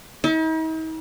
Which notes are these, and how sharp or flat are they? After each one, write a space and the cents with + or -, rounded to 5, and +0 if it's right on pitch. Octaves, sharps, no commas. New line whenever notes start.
D#4 +45